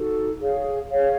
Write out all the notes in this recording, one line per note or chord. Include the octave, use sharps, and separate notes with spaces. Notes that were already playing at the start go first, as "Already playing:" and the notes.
Already playing: D#4 F#4 A4
G#4 C#5 F5
G#4 C#5 F5